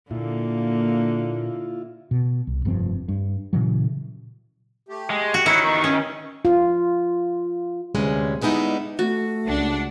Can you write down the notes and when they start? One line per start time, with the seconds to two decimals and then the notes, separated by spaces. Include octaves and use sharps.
0.11 A#2 D3 A#3 E4 F4
2.11 B2
2.47 C2
2.65 F1 G2 F3 C4
3.08 G2
3.53 A#2 C#3 E3 F#3
4.89 A3 G4
5.10 G#3
5.34 F#4 C#7
5.46 D#3 E4 A#4 B4 C#5
5.64 G2 B3 D#4 C#6
5.84 C#4
6.45 F4
7.95 D2 G2 C3 G#3 C#4 B4
8.42 G3 G#3 B3 D#4 E4
8.99 A3 F#4
9.47 C#2 D4 F#5